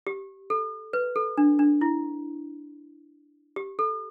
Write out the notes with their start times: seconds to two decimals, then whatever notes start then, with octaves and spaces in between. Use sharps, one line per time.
0.07 G4
0.50 A4
0.93 B4
1.16 A4
1.38 D4
1.59 D4
1.81 E4
3.56 G4
3.79 A4